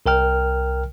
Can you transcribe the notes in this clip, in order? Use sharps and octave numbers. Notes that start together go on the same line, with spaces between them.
C2 A#4 G5 F6